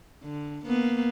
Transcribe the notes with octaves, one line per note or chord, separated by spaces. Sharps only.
D3
A#3 B3